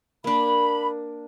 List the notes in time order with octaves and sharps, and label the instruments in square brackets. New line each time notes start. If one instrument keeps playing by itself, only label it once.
[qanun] A#3 D4 [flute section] B5